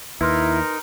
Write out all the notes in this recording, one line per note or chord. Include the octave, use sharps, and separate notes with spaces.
D#2 D#4 E4 A#4 B4 C6 F6